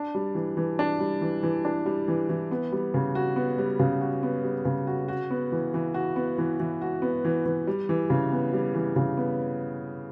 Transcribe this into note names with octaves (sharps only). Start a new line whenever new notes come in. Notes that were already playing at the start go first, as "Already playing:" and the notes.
Already playing: D4
G3
E3
E3
D4
G3
E3
E3
D4
G3
E3
E3
B3
G3
C#3
F#4
B3
G3
C#3
F#4
B3
G3
C#3
F#4
F#4
B3
E3
E3
F#4
B3
E3
E3
F#4
B3
E3
E3
G3
E3
C#3
B3
G3
E3
C#3
B3